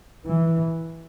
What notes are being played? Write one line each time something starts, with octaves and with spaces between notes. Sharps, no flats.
E3